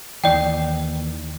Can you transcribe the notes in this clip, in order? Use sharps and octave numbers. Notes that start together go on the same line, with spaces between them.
D#2 E3 D5 G5